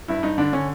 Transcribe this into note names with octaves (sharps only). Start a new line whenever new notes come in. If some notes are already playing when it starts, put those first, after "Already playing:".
G2 E4
G2 D#4
D3 D4
D3 C#4